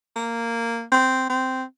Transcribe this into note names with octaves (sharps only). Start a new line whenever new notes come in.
A#3
C4
C4